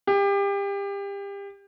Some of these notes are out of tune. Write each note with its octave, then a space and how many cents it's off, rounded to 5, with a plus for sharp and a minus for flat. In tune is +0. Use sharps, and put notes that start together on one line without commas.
G4 +30